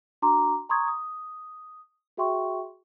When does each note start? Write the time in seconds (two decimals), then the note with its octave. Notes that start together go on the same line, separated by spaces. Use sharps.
0.22 D4 F#4 A#5 C6 D6
0.69 A#5 C6 C#6 D#6 G#6
0.88 D#6
2.17 F#4 G#4 E5 G5 C6 C#6